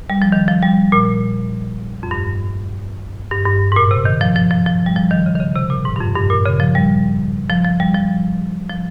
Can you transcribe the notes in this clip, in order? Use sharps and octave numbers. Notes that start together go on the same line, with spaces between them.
G3
F3
D#3
F3
G3
A#2
F2
G2
G2
G2
G#2
A#2
C3
D#3
F3
F3
F3
F3
G3
F3
D#3
C#3
D#3
C#3
C3
A#2
G#2
G2
F2
G2
A#2
C#3
F3
G3
F3
F3
G3
F3
F3